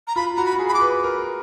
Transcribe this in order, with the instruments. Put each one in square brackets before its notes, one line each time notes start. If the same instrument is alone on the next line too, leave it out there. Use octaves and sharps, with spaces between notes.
[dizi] A#5
[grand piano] F4 [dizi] B5
[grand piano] F#4 [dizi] A#5
[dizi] B5
[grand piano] F#4
G#4
[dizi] B5
D6
[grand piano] B4
A#4